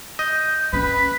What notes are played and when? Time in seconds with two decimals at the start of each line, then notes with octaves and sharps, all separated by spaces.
0.19 D#5 G6
0.73 C4 C#4 B4 B6